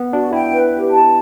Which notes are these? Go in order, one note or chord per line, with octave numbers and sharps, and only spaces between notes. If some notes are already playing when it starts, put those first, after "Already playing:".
Already playing: B3
D4 F#4
E4 G5
B4
G4
A5